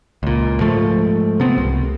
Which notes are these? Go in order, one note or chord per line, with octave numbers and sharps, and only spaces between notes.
C#2 A#2
G#2 F3 A3
C3 B3 C4
C2